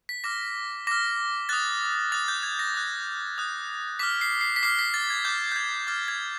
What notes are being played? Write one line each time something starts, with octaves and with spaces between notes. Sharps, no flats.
B6
D6 F6 A#6
D6 F6 A#6
D#6 F#6 A6
D#6 F#6 A6
G6
G#6
A#6
D#6 F#6
D#6 F#6
D6 F6 B6
C7
C7
B6
D6 F6 C7
B6
A6
G#6
D6 F6 G6
G6
G#6
D6 F6 A6
G#6